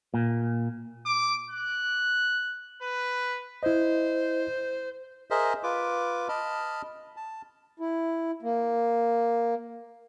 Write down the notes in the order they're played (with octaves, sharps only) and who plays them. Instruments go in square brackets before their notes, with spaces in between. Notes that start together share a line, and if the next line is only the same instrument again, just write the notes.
[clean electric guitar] A#2
[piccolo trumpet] D6
F#6
B4
[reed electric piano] E4 D#5 [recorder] C5
[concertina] G#4 A#4 C5 D#5 E5
F4 B4 D6
D#5 A5 B5 F6
A5
[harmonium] E4
A#3